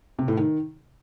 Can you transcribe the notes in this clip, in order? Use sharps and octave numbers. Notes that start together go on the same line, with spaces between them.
C3
A2
D#3